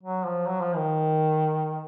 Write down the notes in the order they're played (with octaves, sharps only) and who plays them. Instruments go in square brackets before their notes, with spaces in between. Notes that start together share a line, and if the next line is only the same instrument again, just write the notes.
[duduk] F#3
F3
F#3
F3
D#3